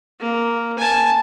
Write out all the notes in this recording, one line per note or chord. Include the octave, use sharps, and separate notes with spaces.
A#3
G#5 A5